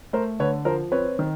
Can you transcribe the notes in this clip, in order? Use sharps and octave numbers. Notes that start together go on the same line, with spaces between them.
A3 A#4 C5
D3 B4 C#5
F3 A#4 C5
C4 B4 C#5
D#3